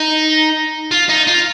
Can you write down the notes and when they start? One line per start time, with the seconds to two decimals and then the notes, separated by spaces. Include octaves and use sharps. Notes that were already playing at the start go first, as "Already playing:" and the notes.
Already playing: D#4
0.91 F4
1.09 D#4
1.27 F4